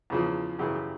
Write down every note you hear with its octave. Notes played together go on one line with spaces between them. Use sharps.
E2 C#3 F3
F#2 C#3 E3 G4
G4